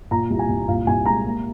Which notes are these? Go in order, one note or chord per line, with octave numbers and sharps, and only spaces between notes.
A#2 A#5
C2
G#5
C2
A#2 F5
C2 G#5
G#3 A#5
A#3